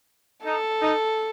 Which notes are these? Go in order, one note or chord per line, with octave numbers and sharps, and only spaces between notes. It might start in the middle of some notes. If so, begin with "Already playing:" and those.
D#4 A4
D#4